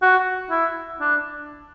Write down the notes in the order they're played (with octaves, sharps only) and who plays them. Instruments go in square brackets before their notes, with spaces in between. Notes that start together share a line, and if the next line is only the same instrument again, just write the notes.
[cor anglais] F#4
E4
D4